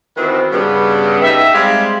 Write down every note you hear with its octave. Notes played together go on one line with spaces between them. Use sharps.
D#3 E3 B3 C4 F#4
G2 C#3 G3 B3
D#4 G4 A4 E5
G3 G#3 C4 G4 G#4 F5